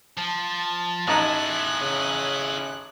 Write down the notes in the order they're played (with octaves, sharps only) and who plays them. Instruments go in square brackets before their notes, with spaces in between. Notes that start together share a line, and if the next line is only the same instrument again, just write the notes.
[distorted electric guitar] F3 [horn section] A5
[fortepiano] A1 D#4 A#5 [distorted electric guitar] E4 G#4 [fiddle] F#6
[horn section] C#3 C#4